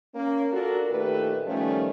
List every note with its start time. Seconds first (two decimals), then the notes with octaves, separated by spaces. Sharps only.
0.14 A#3 C#4
0.52 D4 F4 F#4 A4 A#4
0.90 A#2 D#3 A3 G4 B4
1.46 D#3 F3 G3 A3 C#4